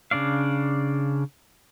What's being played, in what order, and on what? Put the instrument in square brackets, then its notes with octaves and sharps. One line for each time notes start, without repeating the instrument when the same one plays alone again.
[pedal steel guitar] C#3 D4 D5 F5